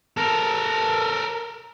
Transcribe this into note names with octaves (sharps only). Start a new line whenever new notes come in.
A4 A#4